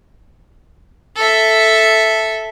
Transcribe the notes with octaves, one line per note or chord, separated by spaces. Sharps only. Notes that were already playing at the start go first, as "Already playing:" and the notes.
A4 E5